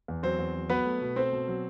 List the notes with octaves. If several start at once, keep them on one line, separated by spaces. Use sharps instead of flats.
E2
F#3 C4 C5
E2
F#3
F#3 B3 B4
A3
B2
A3 C4 C5
B2
F#3